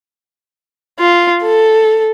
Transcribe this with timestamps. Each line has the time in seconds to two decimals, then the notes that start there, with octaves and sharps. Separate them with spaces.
0.99 F4
1.43 A4